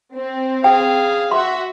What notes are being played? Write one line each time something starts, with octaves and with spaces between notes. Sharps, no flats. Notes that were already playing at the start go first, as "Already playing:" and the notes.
C4
G#4 F5 G5
F#4 E5 C6